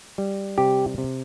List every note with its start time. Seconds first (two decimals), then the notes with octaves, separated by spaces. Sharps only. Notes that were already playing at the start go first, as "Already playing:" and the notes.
0.18 G3
0.58 C3 G4
0.98 C3